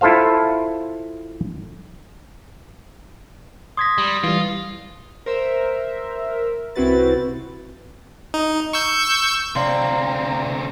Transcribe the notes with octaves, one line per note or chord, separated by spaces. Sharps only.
E4 F4 A4 C5 F5
C6 D#6 G#6 A#6 B6
G3
E3 G3 F4
A#4 C5 E5
C2 C4 E4 F#4 B4 A6
D#4
C#6 E6 G6
D2 C3 C4 D5 F5 A#5 C6